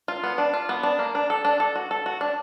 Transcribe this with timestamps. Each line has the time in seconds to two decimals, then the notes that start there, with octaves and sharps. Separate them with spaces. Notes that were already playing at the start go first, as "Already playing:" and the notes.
0.08 F4
0.23 B3
0.38 D4
0.54 F4
0.69 B3
0.83 D4
0.99 A#3
1.15 D4
1.30 A4
1.45 D4
1.60 A4
1.76 F#4
1.91 A4
2.06 F#4
2.21 D4